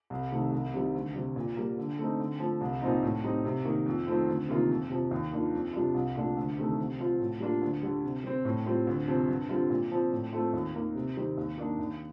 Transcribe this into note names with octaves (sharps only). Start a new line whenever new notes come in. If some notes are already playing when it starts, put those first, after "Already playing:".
C2
C3 D#3 A3
C2
C3 D#3 G3
D2
C3 G3
A#2
G3 A#3
D3
A3 C4 D#4
D3
F3 A3
C2
A#2 F3 C4 D#4
A2
G3 C4 D#4
C3
D#3 A#3
F2
D#3 A3 C4 F4
D2
C3 D#3 A#3 F4
F2
C3 F3
D#2
D#3 A#3 D4 F4
F2
C3 G3 D4 F4
C2
A#2 A3 D4 F4
D2
C3 D#3 A3
C3
F3 C4 F4
A2
G3 A#3 D4 F4
D2
D3 G3
C3
G3 C4
A2
G3 C4 F4
D2
C3 F3 C4
G2
D3 G3 C4 F4
A#2
F3 C4
A2
A3 C4 F4
D#2
D#3 A#3
C3
D#3 G3 C4
D#2
D#3 A#3 D4
D#2